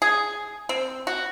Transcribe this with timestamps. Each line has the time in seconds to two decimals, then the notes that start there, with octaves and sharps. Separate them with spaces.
0.02 G#4
0.69 C4
1.07 F#4